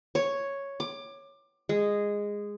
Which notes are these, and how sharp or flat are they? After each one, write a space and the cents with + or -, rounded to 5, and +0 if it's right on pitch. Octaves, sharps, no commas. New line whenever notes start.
C#5 +0
D6 +20
G#3 -10